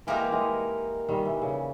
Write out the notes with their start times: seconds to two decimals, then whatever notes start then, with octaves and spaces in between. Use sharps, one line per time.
0.07 E3 G#3 A#3 D#4 G4 A#4
0.32 E3 G#3
1.08 D#3 G3
1.25 E3
1.42 C#3